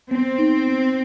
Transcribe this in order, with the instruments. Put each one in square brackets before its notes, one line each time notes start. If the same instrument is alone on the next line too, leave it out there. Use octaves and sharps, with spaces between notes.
[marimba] B3 [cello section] C4
[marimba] D#4
B3